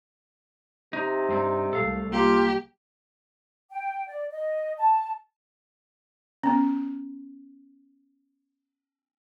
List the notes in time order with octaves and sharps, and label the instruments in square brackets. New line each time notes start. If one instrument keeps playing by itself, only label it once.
[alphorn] C3 [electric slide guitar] D#4
[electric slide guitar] G2 C4 D#4
[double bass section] C2 A3 [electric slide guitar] A4 F5
[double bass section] G3 [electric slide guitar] A#3 [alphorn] F4 [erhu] G4
[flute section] G5
D5
D#5
A5
[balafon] B3 C#4